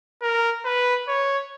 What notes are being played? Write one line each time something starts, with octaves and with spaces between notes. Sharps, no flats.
A#4
B4
C#5